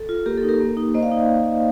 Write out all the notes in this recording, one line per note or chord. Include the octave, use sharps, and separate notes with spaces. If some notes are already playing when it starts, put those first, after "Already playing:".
Already playing: A4
F4
A#3 G4 A#4
A4
D#4
G4 A#4
A#3
D#4
A#3 C5 D#5
D5 F5
D#4